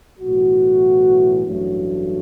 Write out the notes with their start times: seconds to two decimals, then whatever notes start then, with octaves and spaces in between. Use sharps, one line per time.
0.20 B1 A2 E3 F#4
1.44 A1 G2 F#3 A3